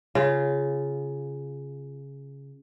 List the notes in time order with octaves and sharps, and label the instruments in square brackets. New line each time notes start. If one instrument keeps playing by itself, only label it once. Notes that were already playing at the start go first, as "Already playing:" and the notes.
[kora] C#3 F4